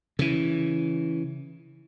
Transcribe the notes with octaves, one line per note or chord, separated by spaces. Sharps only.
C#3 E3